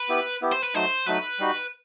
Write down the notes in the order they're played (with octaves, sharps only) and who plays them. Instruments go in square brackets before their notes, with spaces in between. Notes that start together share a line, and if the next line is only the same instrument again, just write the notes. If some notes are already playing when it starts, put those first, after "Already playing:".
Already playing: [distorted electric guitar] B4
[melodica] B3 E4 G4
B3 E4 G4
[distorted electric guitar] C5
B4
[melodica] F#3 A3 D#4 [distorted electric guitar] C5
[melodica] F#3 A3 D#4 [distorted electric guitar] B4
[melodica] G3 D#4 F#4